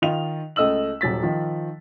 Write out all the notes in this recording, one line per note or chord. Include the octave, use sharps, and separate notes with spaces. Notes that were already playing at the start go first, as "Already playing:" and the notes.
D#3 F4 D#5 F7
C#2 A3 D#5 E6 F#7
D#1 F#3 A6 B6
D#3 F3